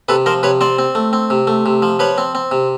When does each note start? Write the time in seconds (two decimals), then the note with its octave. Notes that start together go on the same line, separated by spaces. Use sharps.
0.09 C3 A4 B4
0.26 F3 A#4 C5
0.43 C3 B4 C#5
0.61 C4 C5 D5
0.79 C4
0.95 A3
1.13 C4
1.30 C3
1.47 A3
1.66 C3
1.82 F3
1.99 F3 B4 C#5
2.18 C4
2.35 C4
2.51 C3